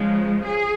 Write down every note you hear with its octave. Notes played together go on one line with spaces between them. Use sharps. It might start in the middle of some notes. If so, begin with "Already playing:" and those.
Already playing: C#3 F3 G#3
G#4